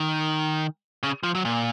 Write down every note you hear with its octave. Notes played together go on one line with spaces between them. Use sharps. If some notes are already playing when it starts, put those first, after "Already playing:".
Already playing: D#3
C#3
F3
F#3
A#2